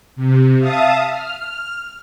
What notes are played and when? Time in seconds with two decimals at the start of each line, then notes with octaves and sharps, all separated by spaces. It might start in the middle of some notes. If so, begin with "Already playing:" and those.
0.16 C3
0.59 E5 F5 A5 D#6
1.11 F6